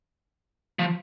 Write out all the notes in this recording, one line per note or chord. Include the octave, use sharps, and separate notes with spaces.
F3